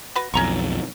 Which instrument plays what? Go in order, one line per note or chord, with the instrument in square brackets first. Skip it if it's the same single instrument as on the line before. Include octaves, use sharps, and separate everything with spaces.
[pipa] F#4 B4
[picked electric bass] B1 F2 [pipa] C#4 A#5 C#6